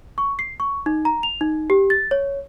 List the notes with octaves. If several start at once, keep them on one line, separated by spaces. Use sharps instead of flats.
C#6
C7
C#6
D#4
A#5
F7
D#4
G4
A6
C#5